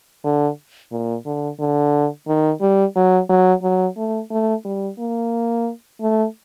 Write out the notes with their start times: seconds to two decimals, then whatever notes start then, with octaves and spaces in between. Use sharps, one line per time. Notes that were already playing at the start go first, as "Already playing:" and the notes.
0.24 D3
0.92 A#2
1.26 D3
1.60 D3
2.28 D#3
2.61 G3
2.96 F#3
3.30 F#3
3.63 F#3
3.97 A3
4.31 A3
4.65 G3
4.99 A#3
6.01 A3